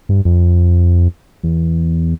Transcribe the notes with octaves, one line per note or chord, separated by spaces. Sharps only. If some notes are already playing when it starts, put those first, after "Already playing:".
G2
F2
E2